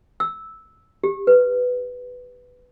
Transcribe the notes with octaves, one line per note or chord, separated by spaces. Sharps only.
E6
G4
B4